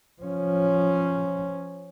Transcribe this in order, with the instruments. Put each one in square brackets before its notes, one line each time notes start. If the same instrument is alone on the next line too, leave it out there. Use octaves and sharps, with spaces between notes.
[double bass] F3 C#4